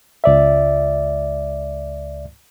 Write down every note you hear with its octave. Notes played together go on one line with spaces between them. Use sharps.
C#2 D5 E5